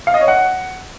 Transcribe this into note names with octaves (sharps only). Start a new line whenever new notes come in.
F5
D#5
C#5
F#5